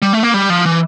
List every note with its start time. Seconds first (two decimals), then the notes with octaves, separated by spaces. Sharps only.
0.02 G3
0.13 A3
0.23 A#3
0.34 G3
0.50 F3
0.65 E3